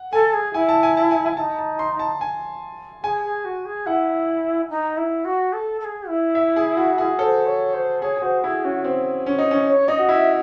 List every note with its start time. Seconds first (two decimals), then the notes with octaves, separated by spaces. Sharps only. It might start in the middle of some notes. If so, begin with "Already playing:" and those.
Already playing: F#5
0.13 A4 G#5
0.34 G#4
0.54 E4 G#5
0.69 A5
0.83 G#5
0.97 A5
1.11 G#5
1.26 G#5
1.37 E4 A5
1.41 D#4
1.59 A5
1.79 C6
1.99 A5
2.21 G#5
3.03 G#4 G#5
3.24 G#4
3.45 F#4
3.65 G#4
3.86 E4 F#5
4.70 D#4
4.97 E4
5.25 F#4
5.53 A4
5.80 A4
5.85 G#4
6.08 E4
6.35 E5
6.56 G#4
6.77 F#4
6.98 G#4
7.18 A4 C5 C#5
7.46 C#5
7.74 C5
8.02 G#4 C#5
8.17 G#4
8.22 F#4 C5
8.43 E4 G#4
8.64 C#4 F#4
8.84 C4
9.26 C#4
9.38 D#4
9.51 C#4
9.68 C#5
9.88 D#4 D#5
9.99 F#4
10.09 E4 E5